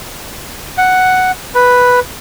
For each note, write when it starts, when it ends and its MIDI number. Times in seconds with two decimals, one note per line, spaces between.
0.78 1.31 78
1.55 2.00 71